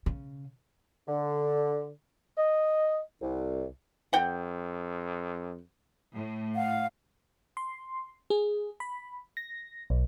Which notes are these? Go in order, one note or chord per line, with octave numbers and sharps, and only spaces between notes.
C#3
D3
D#5
C2
F2 F#5 G5
A2
F5 F#5
C6
G#4
B5
A#6
B1